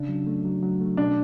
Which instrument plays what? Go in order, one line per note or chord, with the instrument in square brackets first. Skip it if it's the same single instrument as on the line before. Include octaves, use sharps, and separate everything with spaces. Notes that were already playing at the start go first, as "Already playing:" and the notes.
Already playing: [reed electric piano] C#3 D4
F#3
A3
F#3
F#3
A3
[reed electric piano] B2 [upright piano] D4